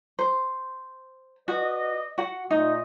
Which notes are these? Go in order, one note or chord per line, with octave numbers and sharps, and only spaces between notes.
C5
F#4 B4 D5 D#5
F#4 F#5
A#2 A3 D#4 D#5